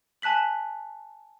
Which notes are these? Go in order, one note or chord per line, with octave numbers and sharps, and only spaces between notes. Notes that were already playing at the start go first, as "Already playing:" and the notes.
G#5 A5 F#6 B6 F#7